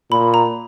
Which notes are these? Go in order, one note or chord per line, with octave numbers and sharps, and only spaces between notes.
A#2 B5
A#5